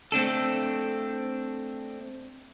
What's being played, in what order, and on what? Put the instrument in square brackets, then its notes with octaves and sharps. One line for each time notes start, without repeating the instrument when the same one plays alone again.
[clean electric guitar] A3 C4 D4 A4